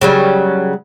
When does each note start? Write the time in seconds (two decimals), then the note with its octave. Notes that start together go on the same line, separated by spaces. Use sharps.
0.01 C#3 F#3 G3